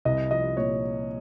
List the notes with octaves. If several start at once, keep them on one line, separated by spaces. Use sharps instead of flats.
C2 D#5
F3 D#5
A#2 C#5